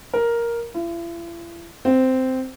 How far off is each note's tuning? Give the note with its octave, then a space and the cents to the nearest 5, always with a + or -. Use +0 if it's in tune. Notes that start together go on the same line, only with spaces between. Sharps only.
A#4 +5
E4 +45
C4 -10